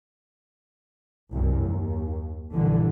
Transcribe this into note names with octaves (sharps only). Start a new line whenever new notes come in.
C2 F#2
D#2
A#1 G2 D3 E3